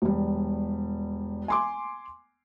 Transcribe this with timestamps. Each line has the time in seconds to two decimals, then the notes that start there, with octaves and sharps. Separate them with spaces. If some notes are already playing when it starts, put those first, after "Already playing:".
0.02 E1 G3
1.48 G#5 C6 D6